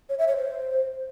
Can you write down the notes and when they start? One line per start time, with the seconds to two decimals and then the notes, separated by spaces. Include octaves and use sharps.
0.09 C#5
0.19 E5
0.28 C#5
0.37 C5